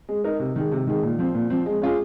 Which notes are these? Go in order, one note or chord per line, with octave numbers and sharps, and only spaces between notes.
G#3
D#4 A#4
C3
D#3 G#3
C3
D#3 G#3
A#2
F3 C4
A#2
F3 C4
G#3
C#4 F4 G#4